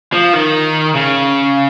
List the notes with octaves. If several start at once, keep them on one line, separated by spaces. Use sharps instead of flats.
F3
D#3
C#3